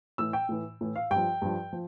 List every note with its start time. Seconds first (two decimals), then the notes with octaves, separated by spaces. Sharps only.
0.18 A2 E3 E6
0.33 G5
0.49 A2 E3
0.81 A2 E3
0.96 F5
1.11 G2 G5
1.16 F3
1.42 G2 F3
1.73 F3